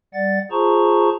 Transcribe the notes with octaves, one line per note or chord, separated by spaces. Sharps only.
G3 D5 F#5 A6
F4 G#4 C5 A5 A#5 C#6